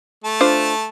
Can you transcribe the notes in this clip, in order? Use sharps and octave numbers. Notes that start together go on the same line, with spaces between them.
A3 A5
D4 F4 C5